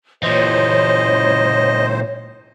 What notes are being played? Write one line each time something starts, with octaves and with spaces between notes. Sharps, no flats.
A#2 E3 C5 C#5 D#5